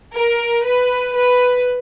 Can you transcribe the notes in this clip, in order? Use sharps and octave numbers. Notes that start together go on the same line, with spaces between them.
A#4
B4
B4